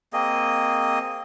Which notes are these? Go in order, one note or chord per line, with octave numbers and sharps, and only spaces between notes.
A#3 C4 G#4 D#5